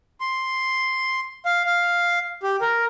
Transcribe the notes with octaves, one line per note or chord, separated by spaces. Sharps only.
C6
F5
F5
G4
A#4